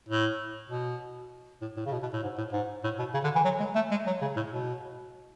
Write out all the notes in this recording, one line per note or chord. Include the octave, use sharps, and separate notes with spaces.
A2
B2
A2
A2
C#3
B2
B2
A2
G#2
A2
G#2
A2
B2
C#3
D3
E3
F#3
G#3
A3
G#3
F#3
C#3
A2
B2